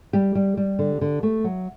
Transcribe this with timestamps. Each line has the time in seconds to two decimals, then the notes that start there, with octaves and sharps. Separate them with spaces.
0.13 G3 G4
0.35 G3
0.57 G3
0.79 D3
1.01 D3
1.23 A3
1.44 F#3